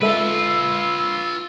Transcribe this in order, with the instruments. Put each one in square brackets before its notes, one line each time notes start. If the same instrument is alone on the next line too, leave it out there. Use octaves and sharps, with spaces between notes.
[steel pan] G#3 A4 E5 [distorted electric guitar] F4 B4 [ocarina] E6